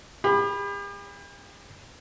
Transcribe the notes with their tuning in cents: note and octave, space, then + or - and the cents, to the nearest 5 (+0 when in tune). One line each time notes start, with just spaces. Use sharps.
G4 +45 B5 +0